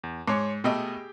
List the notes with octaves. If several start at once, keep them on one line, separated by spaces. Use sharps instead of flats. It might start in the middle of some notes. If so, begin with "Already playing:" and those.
E2
G#2 C#5 C6 D6
B2 A3 G4 G#4 D#5 G5